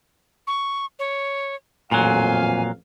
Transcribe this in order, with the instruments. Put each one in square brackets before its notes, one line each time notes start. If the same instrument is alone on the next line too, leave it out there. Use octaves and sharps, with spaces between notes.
[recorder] C#6
C#5
[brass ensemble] A1 F2 F5 [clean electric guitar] A#2 F#3 [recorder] G#5